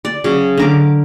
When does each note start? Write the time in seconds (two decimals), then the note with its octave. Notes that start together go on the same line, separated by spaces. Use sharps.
0.05 D5
0.24 C#3 F#3
0.57 D3 A#4 D6